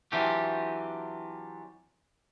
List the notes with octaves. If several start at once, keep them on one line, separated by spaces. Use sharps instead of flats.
E3 F#3 C4 D4 F4 G4